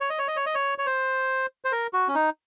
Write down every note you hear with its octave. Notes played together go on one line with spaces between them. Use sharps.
C#5
D#5
C#5
D#5
C#5
D#5
C#5
C#5
C5
C5
A#4
F#4
C#4
D#4